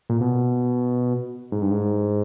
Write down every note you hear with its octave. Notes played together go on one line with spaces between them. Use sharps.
A#2
B2
G#2
G2
G#2